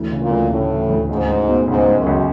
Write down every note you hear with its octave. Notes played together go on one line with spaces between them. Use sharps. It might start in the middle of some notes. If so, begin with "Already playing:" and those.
Already playing: D2 E3
C#3
A#2
D2
A2 C#3
E3
D2
C#2 G#2
G#3
B2
C#2 G#2
G#3
F#2
C#2